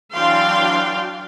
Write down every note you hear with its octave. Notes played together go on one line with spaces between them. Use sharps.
E3 F#3 D4 F5 G5 C6